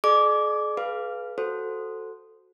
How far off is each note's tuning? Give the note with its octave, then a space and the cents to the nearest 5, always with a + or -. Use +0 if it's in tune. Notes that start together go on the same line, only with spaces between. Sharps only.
G#4 +40 D5 +40 D6 -15
G#4 +30 B4 -10 F5 +0
F#4 +0 A4 +0 C5 -10